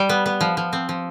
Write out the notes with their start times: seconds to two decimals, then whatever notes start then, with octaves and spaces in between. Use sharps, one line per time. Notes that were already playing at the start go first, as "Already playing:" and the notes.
Already playing: G3
0.09 B3
0.26 B3
0.41 F3
0.57 F3
0.73 C4
0.89 F3